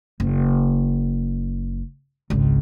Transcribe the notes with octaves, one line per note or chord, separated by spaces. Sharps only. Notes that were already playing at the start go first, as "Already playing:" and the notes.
F#1
G#1 C#2